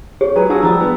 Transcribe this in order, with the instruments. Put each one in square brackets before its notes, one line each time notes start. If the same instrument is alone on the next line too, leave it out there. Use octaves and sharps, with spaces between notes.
[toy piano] G4 G#4 C#5
[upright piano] F#3 G#4 B4 [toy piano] A#5
[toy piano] D4 A5 E6 [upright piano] F4 F#4 G#4
[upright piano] F3 G3 [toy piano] A#5 D#6 E6
[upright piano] B3